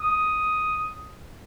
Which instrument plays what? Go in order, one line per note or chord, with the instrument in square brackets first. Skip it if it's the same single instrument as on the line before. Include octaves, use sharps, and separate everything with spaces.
[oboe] D#6